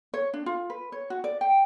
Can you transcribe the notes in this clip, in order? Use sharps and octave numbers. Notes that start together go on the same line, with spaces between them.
C#5
D4
F4
B4
C#5
F#4
D5
G5